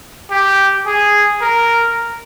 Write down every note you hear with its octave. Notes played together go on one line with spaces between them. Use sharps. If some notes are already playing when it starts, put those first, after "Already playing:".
G4
G#4
A#4